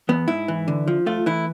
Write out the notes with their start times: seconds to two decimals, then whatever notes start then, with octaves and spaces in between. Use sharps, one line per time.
0.09 E2 B3
0.28 G#2 E4
0.48 E3
0.68 D3
0.88 F3
1.06 A3 F4
1.26 E3 E4